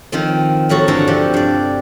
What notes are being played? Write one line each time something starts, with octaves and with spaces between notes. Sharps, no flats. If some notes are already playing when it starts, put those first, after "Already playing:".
D#3 F3 C4
A2 F3 F#3 F#4 A4
G2 D3 E3 A4 C5 A#5
C3 F3 G4 F#5
G2 D5